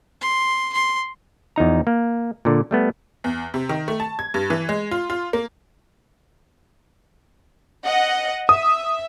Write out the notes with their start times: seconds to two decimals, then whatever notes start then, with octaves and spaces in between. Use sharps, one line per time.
0.21 C6
0.73 C6
1.56 E2 F3 D#4 A#5
1.87 A#3
2.45 A#2 D3
2.71 G3 A3 B3
3.24 E2
3.54 C3
3.69 D#3
3.88 A3
4.00 A5
4.19 G#6
4.34 G2
4.50 E3
4.69 G#3
4.91 F4
5.10 F4
5.33 A#3
7.85 D#5 F#5
8.49 E5 D#6